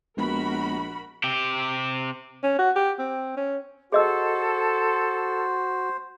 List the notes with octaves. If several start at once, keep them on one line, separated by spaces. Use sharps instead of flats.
A#1 G#3 B3 F#4 A#4 B5
C3 G4
C#4
F#4
G4
C4
C#4
F#4 G#4 A4 C5 D#5 E6